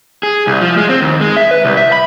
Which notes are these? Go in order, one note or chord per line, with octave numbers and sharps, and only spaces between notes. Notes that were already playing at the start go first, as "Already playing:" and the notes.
G#4
C2
F3
G#3
C4
D#2
G#3
E5
B4
C2
E5
B5